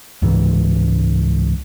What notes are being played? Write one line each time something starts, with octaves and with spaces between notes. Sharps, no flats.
C#2 G#2 E3